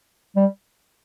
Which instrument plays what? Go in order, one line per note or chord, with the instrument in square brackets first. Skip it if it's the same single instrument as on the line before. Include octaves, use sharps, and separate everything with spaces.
[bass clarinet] G3